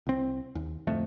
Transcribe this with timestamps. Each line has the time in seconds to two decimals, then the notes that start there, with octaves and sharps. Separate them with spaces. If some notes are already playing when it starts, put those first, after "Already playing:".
0.07 C2 C4
0.55 D#2
0.87 D1 F2 A3